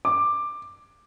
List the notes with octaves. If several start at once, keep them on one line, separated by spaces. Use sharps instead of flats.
D6